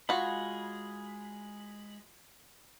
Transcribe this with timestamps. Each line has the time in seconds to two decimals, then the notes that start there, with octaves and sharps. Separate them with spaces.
0.09 G#3 F4 F#4 G#4 B5